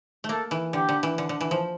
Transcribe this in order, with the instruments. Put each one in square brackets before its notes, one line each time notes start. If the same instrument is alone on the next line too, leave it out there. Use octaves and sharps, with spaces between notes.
[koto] A3
[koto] A#3 [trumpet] A4
[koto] E3
[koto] D3 [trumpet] G4
[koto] D3
E3
D3
D3
E3
F3